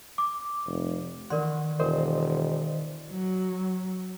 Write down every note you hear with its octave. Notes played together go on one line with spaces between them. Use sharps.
D6
F1
D#3 E3 A#4 D5 F#5 C6
E1 A#4 C5 D5 D#5
F#3